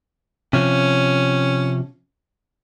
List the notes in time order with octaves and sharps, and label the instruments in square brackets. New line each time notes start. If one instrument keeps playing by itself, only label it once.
[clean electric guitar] C3 F3 [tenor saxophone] C#4